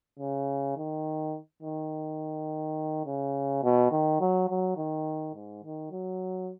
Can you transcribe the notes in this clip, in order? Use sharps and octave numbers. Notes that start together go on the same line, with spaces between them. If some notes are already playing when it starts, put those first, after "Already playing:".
C#3
D#3
D#3
C#3
B2
D#3
F#3
F#3
D#3
G#2
D#3
F#3